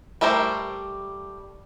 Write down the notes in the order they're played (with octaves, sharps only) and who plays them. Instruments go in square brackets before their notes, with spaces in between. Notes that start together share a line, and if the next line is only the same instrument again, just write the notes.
[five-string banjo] G3 A3 G4 A#4 C5